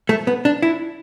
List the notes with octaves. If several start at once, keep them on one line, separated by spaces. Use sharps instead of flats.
A3
B3
D4
E4